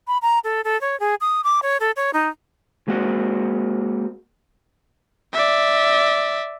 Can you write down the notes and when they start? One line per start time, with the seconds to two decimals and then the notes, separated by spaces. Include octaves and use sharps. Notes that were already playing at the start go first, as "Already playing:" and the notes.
0.07 B5
0.22 A#5
0.44 A4
0.64 A4
0.81 C#5
1.00 G#4
1.21 D#6
1.44 D6
1.62 C#5
1.80 A4
1.96 C#5
2.13 D#4
2.88 G#3 A#3 C4 F#4
5.33 D5 E5